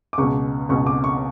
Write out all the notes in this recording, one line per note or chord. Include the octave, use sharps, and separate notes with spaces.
D6
C#2 B2 C#6
C#2 B2 C#6
D6
C#6